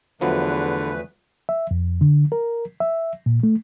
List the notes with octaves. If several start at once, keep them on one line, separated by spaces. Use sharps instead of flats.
E2 D3 F3 F#3 A3 B3 B4
E5
F2
D3
A#4
E5
A#2
A3